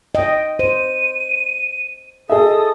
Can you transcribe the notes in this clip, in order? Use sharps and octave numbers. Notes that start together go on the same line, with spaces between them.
D#5 G5
C5 D#7
G#4 A4 D#5 E5 D#6